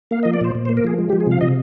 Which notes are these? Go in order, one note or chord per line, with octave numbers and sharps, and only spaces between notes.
A#3 F5
F3 D#5
D5
A#2 C5
A#2
C5
A#3
A#4
F3 G#4
G#3
G4
F3
G#4
C3 F5
C3 D#5